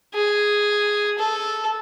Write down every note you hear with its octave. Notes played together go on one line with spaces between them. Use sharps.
G#4
A4